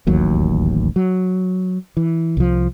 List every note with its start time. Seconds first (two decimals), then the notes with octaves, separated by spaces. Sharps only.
0.07 D1 A1 D#2 F#3
0.96 F#3
1.97 E3
2.37 C2 F3